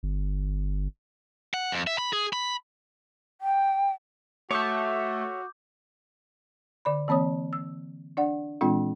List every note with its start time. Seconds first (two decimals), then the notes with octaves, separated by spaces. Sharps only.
0.03 G1
1.54 F#5
1.72 F2
1.87 E5
1.98 B5
2.13 G#4
2.33 B5
3.41 G5
4.51 A3 F#4 C#5 E5 D6 D#6 G6
6.85 D3 D5 B5
7.08 E3 A#3 C4 C#5 D#6
7.53 E6
8.17 D4 D5 F#5
8.61 A#2 E3 G#3 C4 D4 F4